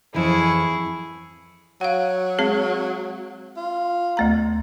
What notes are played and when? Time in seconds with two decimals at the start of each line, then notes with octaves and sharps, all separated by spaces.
0.14 F2 E3 E4 G#4 C#6
1.81 F#3 F5 F#5
2.39 G#3 C4 G#4
3.57 F4
4.17 D2 A3 A#5